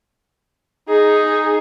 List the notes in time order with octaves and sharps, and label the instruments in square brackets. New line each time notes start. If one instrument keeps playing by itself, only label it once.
[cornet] D#4 [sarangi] G#4